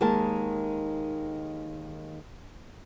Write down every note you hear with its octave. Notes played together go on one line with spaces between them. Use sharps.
D#2 D#3 G#3 A#4 A5